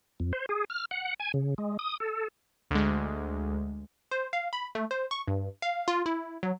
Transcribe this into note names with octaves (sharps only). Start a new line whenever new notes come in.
F2
C5
G#4
F6
F#5
G#5
C#3
G#3
D#6
A4
D2 G#3
C5
F5
B5
A3
C5
C#6
G2
F5
F4
E4
F#3